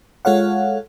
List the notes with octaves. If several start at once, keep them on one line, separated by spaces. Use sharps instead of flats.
G#3 F4 A4 C#5 F5 F#5